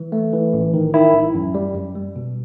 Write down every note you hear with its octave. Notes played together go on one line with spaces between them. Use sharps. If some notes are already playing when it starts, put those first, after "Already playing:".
Already playing: E3
A3
E3
A1
D#3
D#3 E4
A1
F#2
G3
F#2
G3
B2